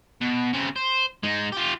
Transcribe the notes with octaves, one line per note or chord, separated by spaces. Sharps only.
B2
C#3 C4
C5
G#3 D#4
F4 G4